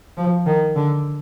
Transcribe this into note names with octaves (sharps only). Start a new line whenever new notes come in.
F3
D#3
D3